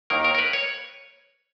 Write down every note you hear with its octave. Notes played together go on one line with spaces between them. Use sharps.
D#2 D#3 A#3 A#4
A#4
A#4
B4
C#5